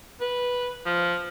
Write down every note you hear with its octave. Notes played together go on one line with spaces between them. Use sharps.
B4
F3